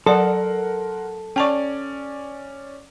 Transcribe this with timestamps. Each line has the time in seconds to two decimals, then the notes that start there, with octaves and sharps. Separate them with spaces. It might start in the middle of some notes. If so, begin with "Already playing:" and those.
0.06 F#3 A4 A#4 D5 F#5 C6
1.36 C#4 D5 G5 A5 C#6